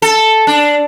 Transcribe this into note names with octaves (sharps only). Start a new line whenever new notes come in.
A4
D4